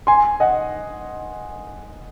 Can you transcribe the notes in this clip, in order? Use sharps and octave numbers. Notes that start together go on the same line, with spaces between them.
G#5 C6
D#5 F#5